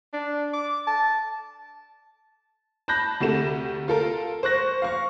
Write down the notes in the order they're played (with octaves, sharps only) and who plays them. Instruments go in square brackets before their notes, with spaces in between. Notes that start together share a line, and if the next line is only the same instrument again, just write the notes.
[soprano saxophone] D4
D6
A5
[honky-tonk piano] A5 B5 F#6 G6 A#6
D2 C3 A3 E7
F4 A4 A#4
C5 C#6 F#6 A#6
F5 C#6